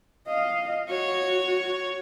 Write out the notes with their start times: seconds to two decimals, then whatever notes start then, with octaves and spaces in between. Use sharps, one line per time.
0.27 D#5 F5
0.90 F#4 C#5